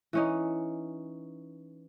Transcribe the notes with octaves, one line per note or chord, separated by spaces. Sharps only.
E3 C#4 D#4